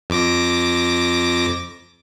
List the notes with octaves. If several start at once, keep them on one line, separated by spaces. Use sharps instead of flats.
F2 D6 A#6